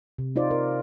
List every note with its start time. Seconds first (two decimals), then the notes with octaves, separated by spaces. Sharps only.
0.18 C3
0.36 D#4 F4 C5 D5
0.51 A#4